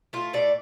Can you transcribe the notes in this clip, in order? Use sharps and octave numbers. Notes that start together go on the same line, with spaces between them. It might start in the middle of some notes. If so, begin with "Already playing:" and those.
A3 F4
A2 D5